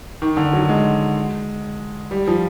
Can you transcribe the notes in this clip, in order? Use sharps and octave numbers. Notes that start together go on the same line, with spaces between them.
D#3
D3
F#3
G#3
G3
F3